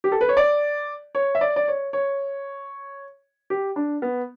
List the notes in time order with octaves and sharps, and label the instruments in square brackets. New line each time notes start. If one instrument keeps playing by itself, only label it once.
[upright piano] G4
A4
B4
C#5
D5
C#5
E5
D5
D5
C#5
C#5
G4
D4
B3